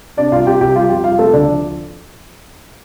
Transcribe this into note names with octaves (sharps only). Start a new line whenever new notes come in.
C3 D4 D5
C2 F4 F5
C2 G4 G5
C2 G4 G5
G3 F4 F5
F2 G4 G5
G3 F4 F5
C3 A3 A4
D2 D4 D5
F3